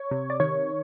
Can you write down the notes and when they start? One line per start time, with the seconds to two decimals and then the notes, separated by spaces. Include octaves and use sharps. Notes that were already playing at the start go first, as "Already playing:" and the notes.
Already playing: C#5
0.11 C3
0.30 D5
0.40 D#3 C#5